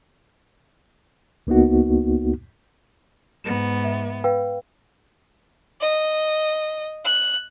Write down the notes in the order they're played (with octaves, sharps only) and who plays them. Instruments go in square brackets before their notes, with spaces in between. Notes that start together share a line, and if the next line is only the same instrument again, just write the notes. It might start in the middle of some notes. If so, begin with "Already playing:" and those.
[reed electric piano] C#2 A#3 B3 D#4 F#4
[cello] G#2 B3 [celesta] E7
[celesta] E5
B4 F5 G5
[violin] D#5
F#6